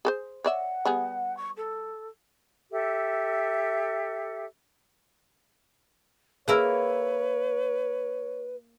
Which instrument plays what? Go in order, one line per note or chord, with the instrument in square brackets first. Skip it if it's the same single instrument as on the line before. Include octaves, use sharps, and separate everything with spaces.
[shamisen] G#4 A4 C5
[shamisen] C#5 D5 E5 [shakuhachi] F#5
[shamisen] G3 B3 G#4
[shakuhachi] C#6
A4
[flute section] G4 A4 E5
[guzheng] A#3 E4 A#4 [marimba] G#4 E6 F6 [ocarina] B4 [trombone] C#5